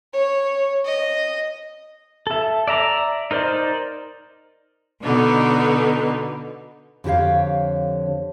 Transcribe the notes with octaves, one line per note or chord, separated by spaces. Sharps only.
C#5
D#5
A4 E5
D5 E5 A#5 D6
D#4 A#4 C5 D5
B2 D3 B3 D#4
F2 D3 G4 C#5 F5